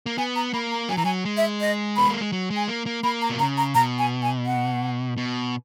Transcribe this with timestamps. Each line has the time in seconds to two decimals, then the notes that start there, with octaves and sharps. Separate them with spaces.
0.06 A#3
0.18 B3 G#5
0.36 A#5
0.53 A#3 B5
0.71 A#5
0.89 F#3 G#5
0.97 E3 A#5
1.05 F#3 G#5
1.25 G#3
1.37 E5
1.61 D#5
1.96 B3 B5
2.09 A#3
2.21 G#3
2.32 F#3
2.50 G#3
2.56 G#5
2.68 A#3
2.86 A#3
3.03 A#3 B5
3.22 A#5
3.30 B2
3.39 C#3 A#5
3.57 A#5
3.75 B2 A#5
3.99 G#5
4.22 G#5
4.46 F#5
5.18 B2